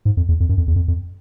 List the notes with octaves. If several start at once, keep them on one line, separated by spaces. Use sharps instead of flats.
G#2
F2
E2
F2
F#2
F2
E2
F2
F2